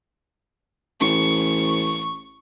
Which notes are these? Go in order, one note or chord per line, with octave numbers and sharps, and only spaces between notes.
A1 C#6